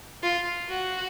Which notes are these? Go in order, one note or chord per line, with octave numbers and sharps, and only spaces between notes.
F4
F#4